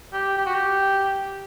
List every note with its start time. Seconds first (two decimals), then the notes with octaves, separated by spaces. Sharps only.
0.13 G4
0.37 G4
0.46 F#4
0.54 G4